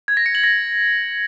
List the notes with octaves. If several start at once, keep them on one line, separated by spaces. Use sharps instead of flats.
G#6
A#6
C#7
F#7
A#6